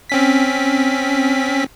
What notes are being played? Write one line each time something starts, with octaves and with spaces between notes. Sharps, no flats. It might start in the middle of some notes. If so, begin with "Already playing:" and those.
C4 C#4 B6